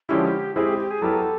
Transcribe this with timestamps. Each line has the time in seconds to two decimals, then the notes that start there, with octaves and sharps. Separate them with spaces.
0.09 D3 F3 G#3 C#4 E4 G4
0.55 G#3 C4 E4 G4 G#4
0.79 G4
0.91 G#4
1.02 F#3 B3 E4 G4 A4 A#4